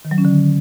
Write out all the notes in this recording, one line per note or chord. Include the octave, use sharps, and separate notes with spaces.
D#3
F#3
C#4
D3